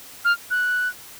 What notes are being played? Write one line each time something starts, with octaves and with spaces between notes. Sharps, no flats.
F6
F#6